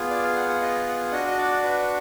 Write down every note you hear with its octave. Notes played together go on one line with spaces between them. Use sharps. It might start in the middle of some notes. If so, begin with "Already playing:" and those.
Already playing: B3 F4 G#4
D5
F5
F#5
F#5
D#5
F#5
D4 F#4 D#5
D#5
D5
B4